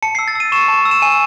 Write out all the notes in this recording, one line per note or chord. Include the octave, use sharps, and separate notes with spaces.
A5 C#7
C7
E6
A6
E6 D#7
C#6 E7
A5
E6
E7
G#5 D#7